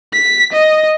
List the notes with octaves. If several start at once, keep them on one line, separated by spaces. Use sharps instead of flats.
B6
D#5